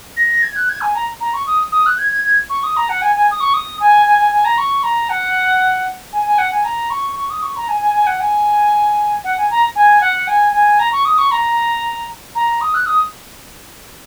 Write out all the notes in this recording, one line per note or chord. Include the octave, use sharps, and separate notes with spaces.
A#6
G#6
F#6
G#6
G#5
A#5
A#5
C#6
D#6
D#6
F#6
G#6
G#6
G#6
C#6
D#6
A#5
F#5
G#5
G#5
D#6
C#6
D#6
G#5
G#5
G#5
G#5
A#5
C#6
A#5
F#5
G#5
G#5
F#5
G#5
A#5
C#6
C#6
D#6
C#6
A#5
G#5
G#5
G#5
F#5
G#5
F#5
G#5
A#5
G#5
F#5
G#5
G#5
A#5
C#6
D#6
C#6
A#5
A#5
D#6
F#6
D#6